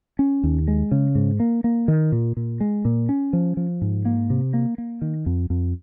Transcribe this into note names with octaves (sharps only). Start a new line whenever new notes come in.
C#4
D#2
G#3
C#3
G#2
A#3
A#3
D#3
A#2
A#2
G#3
A#2
C#4
F3
F3
G#2
A#3
C3
A#3
A#3
D#3
F2
F2